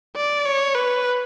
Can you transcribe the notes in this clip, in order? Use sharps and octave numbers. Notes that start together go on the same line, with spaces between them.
D5
C#5
B4